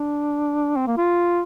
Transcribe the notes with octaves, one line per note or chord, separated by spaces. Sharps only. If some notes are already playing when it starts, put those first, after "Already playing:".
Already playing: D4
C4
A#3
F4